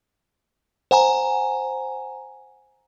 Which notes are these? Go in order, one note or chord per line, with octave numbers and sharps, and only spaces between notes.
C5 F#5 G#5 A#5